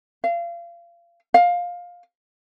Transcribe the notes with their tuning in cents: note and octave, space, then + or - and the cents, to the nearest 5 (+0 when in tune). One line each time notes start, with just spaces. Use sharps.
F5 -30
F5 +15